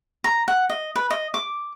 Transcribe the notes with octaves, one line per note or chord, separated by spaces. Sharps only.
A#5
F#5
D#5
B4
D#5
D6